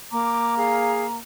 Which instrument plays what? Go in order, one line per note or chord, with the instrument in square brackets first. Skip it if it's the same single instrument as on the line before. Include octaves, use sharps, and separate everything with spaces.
[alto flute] A#3 [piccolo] A#5 [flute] D6
[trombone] G#4 [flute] F5